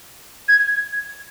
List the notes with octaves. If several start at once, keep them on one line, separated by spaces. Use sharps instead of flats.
G#6